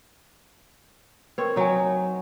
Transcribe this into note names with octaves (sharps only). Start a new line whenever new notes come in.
C4 A#4 B4 C#5
F#3 D#4 C#5 G#5